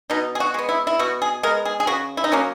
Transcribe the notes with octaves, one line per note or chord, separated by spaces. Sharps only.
B2 D#4
G#4
F#4
G#3 B3
E4
E4
B2 F#4
G#4
G#3 B3 A#4
G#4
G#4
C#3 F#4
E4
D#4
F#3 A#3 C#4